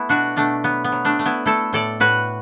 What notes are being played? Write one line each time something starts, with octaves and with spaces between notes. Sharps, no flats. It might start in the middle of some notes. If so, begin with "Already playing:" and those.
Already playing: A3 B3 E4
B2 D4 F#4
B2 A3 D4
F#3 B3
B3
F#3
A3 D4
A3
B3 E4
A3 E4 A4
A2 A4 D5
A2 F#4 B4